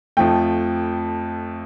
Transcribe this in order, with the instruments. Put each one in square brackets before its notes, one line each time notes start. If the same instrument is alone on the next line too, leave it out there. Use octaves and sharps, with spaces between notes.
[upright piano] F2 F3 A3 G5